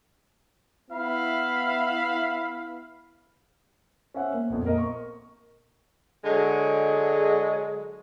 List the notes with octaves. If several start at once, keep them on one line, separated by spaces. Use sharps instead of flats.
B3 E4 E5 F5 B5
C#4 C5 E5 F#5
A#3
A#1 F2
A#3 A#4 D#5
C#6
D3 F#3 G#3